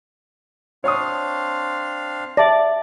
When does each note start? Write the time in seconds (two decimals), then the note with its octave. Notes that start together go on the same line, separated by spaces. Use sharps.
0.84 C4 D4 C#5 F5 C#6 D#6
2.37 D5 E5 A5 A#6